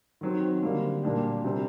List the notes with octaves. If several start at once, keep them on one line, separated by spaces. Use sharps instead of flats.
D#3 F#3 C4
D3 G3 A#3
A#2 G3 A#3 D4 G4
C3 G3 C4